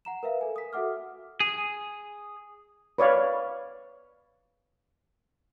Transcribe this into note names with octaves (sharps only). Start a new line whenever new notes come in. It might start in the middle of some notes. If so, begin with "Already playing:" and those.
F#5 A#5 E7
A#4 B4 E5 F5
A4 G#5
D#6 B6
F#4 A4 E5 F#5 D6 F6
G#4
B4 C#5 D5 F5